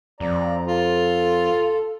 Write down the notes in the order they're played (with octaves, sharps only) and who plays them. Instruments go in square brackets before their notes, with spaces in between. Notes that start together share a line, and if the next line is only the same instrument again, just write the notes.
[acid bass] F2 [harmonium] D5 A#5
[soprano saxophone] F4 [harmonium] A4